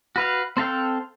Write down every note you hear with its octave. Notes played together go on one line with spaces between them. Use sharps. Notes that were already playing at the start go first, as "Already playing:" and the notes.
F#4 B4 F5
C4 A4 F5 G5